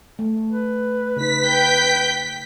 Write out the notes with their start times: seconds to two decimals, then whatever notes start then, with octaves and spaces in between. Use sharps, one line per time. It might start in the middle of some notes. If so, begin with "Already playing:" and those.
0.19 A3
0.51 B4
1.17 C#3 D#4 B6
1.48 G5 G6